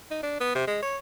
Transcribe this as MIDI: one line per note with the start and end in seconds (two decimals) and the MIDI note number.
0.11 0.20 63
0.23 0.37 62
0.40 0.52 59
0.55 0.66 48
0.67 0.81 56
0.82 0.97 73